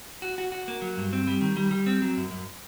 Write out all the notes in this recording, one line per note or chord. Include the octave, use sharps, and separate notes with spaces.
F#4
F#4
F#4
A#3
F#3
G2
C4
G3
D#3
G3
G3
C4
F#3
F#2
F#2